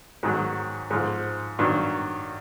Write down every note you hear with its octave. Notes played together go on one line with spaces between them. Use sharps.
G#2 D#3 F#3
G#2 F3
G2 D#3 F#3